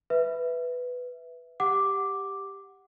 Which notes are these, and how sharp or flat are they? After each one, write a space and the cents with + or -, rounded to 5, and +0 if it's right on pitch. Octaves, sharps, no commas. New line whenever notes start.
B4 +5 E5 +0
G4 +5 F#5 +0 D6 +0